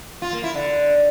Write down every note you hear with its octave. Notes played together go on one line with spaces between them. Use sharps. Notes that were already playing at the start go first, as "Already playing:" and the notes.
F4
A#3
E4
D3